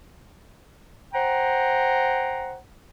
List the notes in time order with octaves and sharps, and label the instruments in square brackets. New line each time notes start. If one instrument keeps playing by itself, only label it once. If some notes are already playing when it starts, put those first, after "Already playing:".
[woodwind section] C5 F#5 G5 A#5